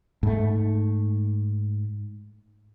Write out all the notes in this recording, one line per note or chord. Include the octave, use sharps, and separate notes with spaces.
G#2 A3